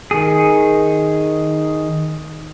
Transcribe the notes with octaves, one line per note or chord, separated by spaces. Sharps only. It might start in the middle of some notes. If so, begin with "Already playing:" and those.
D#3 G#4